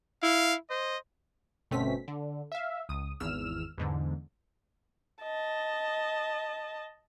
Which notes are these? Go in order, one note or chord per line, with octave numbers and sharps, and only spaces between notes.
E4 F5
C5 D#5
G1 B2 A3 C4 C#4 B6
D3
E5 F5
C#2 D#6
G#1 E2 E6 F6 E7
E2 G#2 D3
D#5 A5